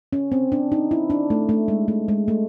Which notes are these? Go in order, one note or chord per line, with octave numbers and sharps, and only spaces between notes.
C#4
C4
D4
D#4
E4
D4
A3
A3
G#3
A3
G#3
A3